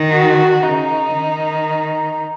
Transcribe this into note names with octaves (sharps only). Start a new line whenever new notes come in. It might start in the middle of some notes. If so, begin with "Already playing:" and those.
Already playing: D#3
F#4
C#3 D#4
D#3